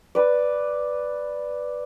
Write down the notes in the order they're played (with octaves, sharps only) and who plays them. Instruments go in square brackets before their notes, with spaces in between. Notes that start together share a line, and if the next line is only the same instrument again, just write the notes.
[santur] B4 D5